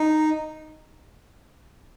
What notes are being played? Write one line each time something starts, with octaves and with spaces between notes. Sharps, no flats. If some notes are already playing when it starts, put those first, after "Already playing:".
Already playing: D#4